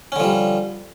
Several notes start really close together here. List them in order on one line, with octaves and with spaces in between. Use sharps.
C#4 D3 F3 G3